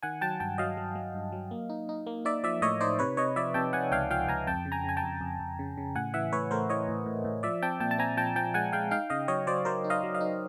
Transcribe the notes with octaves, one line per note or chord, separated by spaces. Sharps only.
D#3 F#5 G#5
F#3 G5 A5
G2 G5 A5
F#3 D#5 F5
F#3
F#3
G2
F#3
A#3
D#4
D#4
A#3
D#4 D5 E5
F3 D5 E5
A2 C#5 D#5
D#4 C5 D5
C3 B4 C#5
C3 C#5 D#5
F3 D5 E5
C3 G5 A5
C3 F#5 G#5
C#2 F5 G5
F3 F5 G5
C#2 G#5 A#5
F2 G5 A5
C#3
G#5 A#5
C#3 G#5
G5 A5
F2
F2
F2
C#3
C#3
A2 F#5 G#5
E3 E5 F#5
A2 B4 C#5
A3 A#4 C5
E3 C#5 D#5
A2
A2
A2
F3 D5 E5
C4 G5 A5
A#2 G5 A5
A5
C4 G#5 A#5
F3 G5 A5
F3 G5 A5
G#3 F#5 G#5
G#3 F5 G5
D#4 F5 G5
C#3 D#5 F5
F#3 C#5 D#5
F#3 C5 D5
F#3 A#4 C5
D#4
D#5 F5
F#3
D#5 F5
D#4